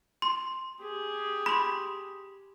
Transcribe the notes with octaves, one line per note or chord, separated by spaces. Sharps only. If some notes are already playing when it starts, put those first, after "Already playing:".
C6
G4 G#4
B5 C6